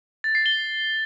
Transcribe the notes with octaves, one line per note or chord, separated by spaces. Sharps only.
A6
C7
G7